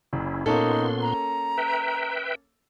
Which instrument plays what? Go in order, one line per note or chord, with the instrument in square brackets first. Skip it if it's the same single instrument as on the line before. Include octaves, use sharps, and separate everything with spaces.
[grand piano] F#1 [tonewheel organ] C#4 E4
[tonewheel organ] A#2 B3 C6 [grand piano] A#3 C#4 A4 [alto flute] D#4
[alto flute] A#5
[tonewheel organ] B4 E5 G5